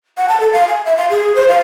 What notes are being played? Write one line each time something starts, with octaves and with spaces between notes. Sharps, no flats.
F#5
A5
A4
F5
G#5
E5
F5
G#4
C5
F5